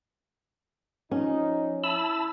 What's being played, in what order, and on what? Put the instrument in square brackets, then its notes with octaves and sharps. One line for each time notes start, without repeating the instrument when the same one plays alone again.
[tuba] F3 [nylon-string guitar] C#4 [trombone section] D#4
[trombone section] E4 [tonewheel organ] A5 B5 E6